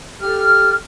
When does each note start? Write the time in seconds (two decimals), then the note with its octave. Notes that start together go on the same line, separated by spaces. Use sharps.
0.21 G4 A4 F6